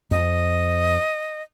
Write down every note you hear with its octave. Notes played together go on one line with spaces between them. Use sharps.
F2 D#5